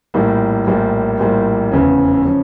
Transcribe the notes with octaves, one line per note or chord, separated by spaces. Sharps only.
A#1 A2 G3 A#3
A#1 A2 G3 A#3
A#1 A2 G3 A#3
F1 E2 C#3 F3 C#4
C#3 F3 C#4